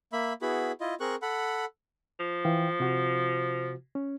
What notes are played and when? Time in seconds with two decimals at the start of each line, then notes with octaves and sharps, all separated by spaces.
0.13 A#3 E5 B5
0.42 B3 E4 F#4 G#4 B5
0.81 E4 F4 D#5
1.00 C4 G#4 A#4 C#6 F#6
1.22 A4 F#5 B5
2.20 F3
2.45 E3 F5 G5
2.80 C3 F#4
3.95 C#4